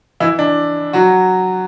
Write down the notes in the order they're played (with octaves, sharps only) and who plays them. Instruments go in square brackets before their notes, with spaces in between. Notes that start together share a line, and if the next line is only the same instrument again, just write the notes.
[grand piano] E3 E4
D4
F#3 F#4